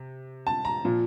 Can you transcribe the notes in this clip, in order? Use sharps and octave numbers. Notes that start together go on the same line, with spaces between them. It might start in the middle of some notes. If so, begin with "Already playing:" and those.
Already playing: C3
A5
A#5
A#2 F3